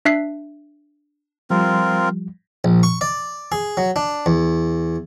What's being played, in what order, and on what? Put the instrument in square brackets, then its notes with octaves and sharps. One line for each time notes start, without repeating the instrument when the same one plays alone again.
[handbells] D4 E5 F#6 B6 C7
[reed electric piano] F3 G3 [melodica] C4 F4 A#4
[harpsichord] A#1
C#6
D5
G#4
F#3
D4
E2